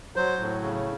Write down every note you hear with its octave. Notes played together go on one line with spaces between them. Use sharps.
F#3 C5
A2
C#3